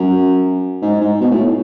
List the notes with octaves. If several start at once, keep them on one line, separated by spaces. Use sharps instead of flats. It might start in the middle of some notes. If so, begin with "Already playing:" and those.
Already playing: F#2
G#2
G#2
B2
A2